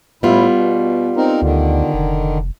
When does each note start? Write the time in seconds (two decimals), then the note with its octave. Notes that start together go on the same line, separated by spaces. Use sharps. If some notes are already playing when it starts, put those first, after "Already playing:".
0.23 A2 G3 B3 E4 F4
0.54 B2
1.17 C4 D#4 A#4
1.42 D2 D3 D#3
1.94 F1